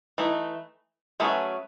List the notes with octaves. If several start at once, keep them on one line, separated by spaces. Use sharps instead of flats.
E3 A3 D#4
F#3 A3 C#4 G#4 B4